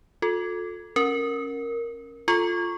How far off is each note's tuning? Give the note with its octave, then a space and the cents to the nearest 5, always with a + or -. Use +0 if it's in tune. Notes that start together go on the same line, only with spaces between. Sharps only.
F4 +40 A4 +0
C#4 -10 A#4 +0
F4 +0 A4 +0 C#6 +0